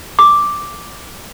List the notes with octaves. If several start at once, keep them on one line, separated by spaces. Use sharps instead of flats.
D6